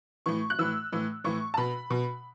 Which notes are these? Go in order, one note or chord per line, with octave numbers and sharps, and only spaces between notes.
A2 E3 C#6
F#6
A2 E3 E6
A2 E3
A2 E3 C#6
A5
B2 B5
B2